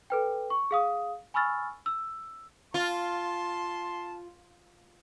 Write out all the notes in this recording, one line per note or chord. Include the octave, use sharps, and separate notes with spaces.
A4 B4 G5
C#6
G#4 F5 D#6
G#5 B5 C#6 E6 F6 A6
E6
F4 A5 C6